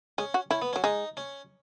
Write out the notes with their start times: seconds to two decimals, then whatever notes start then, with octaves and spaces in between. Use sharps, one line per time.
0.18 G#3 C#4
0.34 F#4
0.51 C#4 E4
0.62 B3
0.73 C#4
0.76 F#3
0.84 G#3 D#4
1.17 C#4